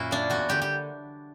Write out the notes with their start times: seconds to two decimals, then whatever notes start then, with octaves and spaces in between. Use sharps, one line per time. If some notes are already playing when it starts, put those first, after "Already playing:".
Already playing: F#2 A#2 E4 F#4
0.11 A#3 D4
0.30 E2 F#4
0.49 D3 G3 G4
0.62 G4